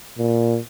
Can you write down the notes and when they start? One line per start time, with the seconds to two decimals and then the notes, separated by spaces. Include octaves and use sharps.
0.18 A#2